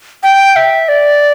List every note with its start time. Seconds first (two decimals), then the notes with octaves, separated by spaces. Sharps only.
0.23 G5
0.56 E5
0.89 D5